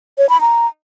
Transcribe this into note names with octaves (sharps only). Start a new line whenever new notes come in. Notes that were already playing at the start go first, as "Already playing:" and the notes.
C#5
B5
A#5